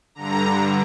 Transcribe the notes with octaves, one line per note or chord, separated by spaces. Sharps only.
G2 D3 A#5